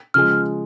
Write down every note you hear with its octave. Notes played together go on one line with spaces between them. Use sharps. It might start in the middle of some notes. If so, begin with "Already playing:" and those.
C#3 F3 G#3 F6